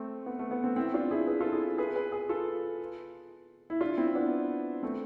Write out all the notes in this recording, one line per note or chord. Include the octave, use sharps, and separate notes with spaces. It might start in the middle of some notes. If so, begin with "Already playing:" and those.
Already playing: A3 C4
B3
A3
B3
A3 C4
C4 E4
D4 F4
E4 G#4
G#4 B4
F4 A4
E4 G#4
G#4 B4
G#4 B4
G#4 B4
F4 A4
E4
D4 F4
C4 E4
B3 D4
A3 C4